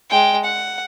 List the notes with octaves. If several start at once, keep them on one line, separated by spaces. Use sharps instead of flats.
G#3 G5
F#5